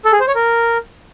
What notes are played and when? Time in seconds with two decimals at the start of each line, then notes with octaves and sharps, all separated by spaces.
0.05 A4
0.12 G#4
0.20 C5
0.28 C#5
0.35 A#4